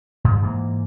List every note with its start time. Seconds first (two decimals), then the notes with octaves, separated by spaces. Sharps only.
0.24 G2
0.42 G#2 E3 A#3